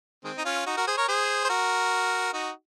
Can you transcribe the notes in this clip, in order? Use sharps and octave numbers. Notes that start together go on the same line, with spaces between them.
D#3 G#3 C4
D#4
C#4 F4
D#4 F#4
F#4 A#4
G#4 C5
A#4 C#5
G#4 C5
C5
F#4 A#4
D#4 F#4